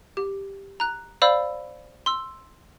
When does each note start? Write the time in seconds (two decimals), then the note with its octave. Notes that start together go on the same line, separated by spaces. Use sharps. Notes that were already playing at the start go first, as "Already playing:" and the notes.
0.17 G4
0.80 A#5 F#6
1.22 C5 D5 F5 B5 E6
2.06 C6 E6